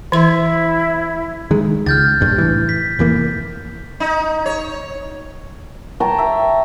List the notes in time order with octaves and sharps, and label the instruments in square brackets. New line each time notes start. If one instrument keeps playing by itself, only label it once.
[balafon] E3 C6 [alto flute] E4
[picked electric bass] D#3 G#3
[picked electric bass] C#2 [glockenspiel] F6 G6 A6
[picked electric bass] F1 A#1 G2
A2 E3
[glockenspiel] B6
[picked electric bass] F1 E3 A#3
[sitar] D#4
C#5
[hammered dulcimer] C#5 G5 A5 A#5
E5